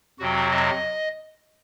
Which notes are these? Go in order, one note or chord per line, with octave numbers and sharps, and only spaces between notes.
F2 C3 F#3 C4 F#4
D#5